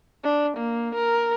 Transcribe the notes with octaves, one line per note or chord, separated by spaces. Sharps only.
D4
A#3
A#4